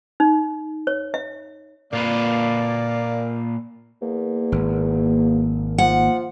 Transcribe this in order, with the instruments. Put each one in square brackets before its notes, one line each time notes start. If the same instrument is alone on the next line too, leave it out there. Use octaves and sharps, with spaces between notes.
[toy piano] D#4
C#5
E5
[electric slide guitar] A#2 F4 B4 [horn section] A#3 D5
[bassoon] E2 [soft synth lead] A#3
[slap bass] G#1
[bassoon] F3 [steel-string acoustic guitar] F#5